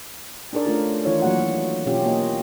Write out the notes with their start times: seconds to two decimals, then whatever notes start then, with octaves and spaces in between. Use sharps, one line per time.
0.53 D4 D#4 G#4 A#4 D5
0.66 A3 C#4 D4 F4 A#4
1.05 D#3 E3 D#4 F4 C#5
1.22 E3 F#3 A#3 F#4 D#5 F#5
1.86 B2 C#4 F4 G4
2.05 A#3 F4 D#5